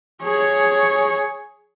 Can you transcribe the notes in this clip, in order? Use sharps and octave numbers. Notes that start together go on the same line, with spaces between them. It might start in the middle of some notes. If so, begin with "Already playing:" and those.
G#4 C#5